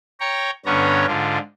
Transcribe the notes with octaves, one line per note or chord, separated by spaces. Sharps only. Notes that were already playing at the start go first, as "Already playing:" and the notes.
C#5 G5 A#5 C#6
G2 D3 B3 C#4 C#5 A#5
G#2 D3 D4 F4